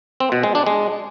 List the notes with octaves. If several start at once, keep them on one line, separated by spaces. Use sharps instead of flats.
C4
B2
G#3
D4
G#3